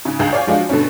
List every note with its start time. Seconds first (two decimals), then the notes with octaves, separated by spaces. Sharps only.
0.05 G#2 C#3
0.19 C#2 G2 G#4 F5 G6
0.32 C#5 D5 F5 G#5
0.47 F3 G#3 D4 F4 F#4
0.69 G2 B2 D3 A3 C#4